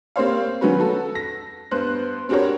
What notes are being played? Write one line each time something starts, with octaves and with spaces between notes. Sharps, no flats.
A#3 C4 G4 C5 C#5 F5
D#3 F#3 B3 C#4 F#4 B4
F#4 A4
A#6
G2 B3 C5 F#6
C4 D4 F#4 G4 A#4 C#5